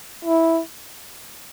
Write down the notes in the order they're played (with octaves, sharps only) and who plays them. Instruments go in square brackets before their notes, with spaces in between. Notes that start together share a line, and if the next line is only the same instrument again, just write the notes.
[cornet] E4